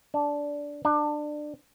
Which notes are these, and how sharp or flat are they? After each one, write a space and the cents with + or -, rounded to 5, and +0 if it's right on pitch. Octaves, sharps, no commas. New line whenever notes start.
D4 -10
D4 +25